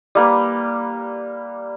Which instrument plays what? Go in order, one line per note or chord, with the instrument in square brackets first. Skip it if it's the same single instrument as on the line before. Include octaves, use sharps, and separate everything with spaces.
[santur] G3 A#3 B4